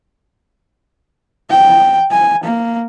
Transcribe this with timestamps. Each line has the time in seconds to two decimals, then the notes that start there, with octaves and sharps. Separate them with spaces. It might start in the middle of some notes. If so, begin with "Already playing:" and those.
1.50 G5
2.11 G#5
2.44 A#3